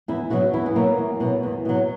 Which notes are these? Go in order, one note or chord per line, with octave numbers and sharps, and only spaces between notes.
E2 E4
B2 F#3 F#4
E2 E4
B3
B2 F#3 A#3
E2
B2 F#3
E2
B2 F#3